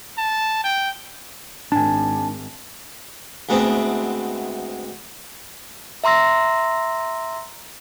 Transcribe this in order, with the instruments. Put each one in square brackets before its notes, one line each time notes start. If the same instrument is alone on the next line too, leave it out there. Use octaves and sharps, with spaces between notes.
[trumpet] A5
G5
[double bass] G#1 [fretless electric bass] D4 [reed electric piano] G#5 A5
[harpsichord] D2 G#3 A3 B3 C4
[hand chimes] E5 A#5 C6 E6 A#6